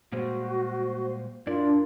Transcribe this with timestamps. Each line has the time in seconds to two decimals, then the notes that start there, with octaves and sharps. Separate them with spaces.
0.12 A#2 G3 G#3 F#4 C5
1.47 F#2 D4 E4 F4 A#4 D5